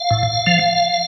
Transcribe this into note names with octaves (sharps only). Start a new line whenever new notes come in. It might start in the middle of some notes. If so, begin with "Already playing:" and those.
Already playing: F5
A2
F3